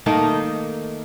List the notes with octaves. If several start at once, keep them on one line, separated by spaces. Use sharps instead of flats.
D#3 A3 A#3 D#4